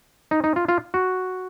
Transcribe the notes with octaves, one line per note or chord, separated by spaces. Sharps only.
D#4
D#4
F4
F4
F#4